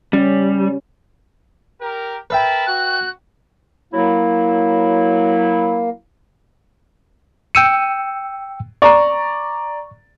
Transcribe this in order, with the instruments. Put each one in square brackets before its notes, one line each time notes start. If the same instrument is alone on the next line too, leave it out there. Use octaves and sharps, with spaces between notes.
[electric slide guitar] G3 [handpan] C#4
[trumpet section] G4 A#4
[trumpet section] A#4 A5 B5 [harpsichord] B4 E5 G5
[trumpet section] F#4 [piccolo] F#6
[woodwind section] F#3 E4 [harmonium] A#3
[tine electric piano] G5 E6 C#7 [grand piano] D#7
[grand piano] D5 A#5 [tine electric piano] C#6